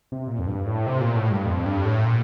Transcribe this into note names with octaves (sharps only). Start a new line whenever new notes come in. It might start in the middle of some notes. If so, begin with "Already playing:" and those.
C3
A#2
F2
G2
A2
C3
A#2
A2
G2
F2
G2
A2
A#2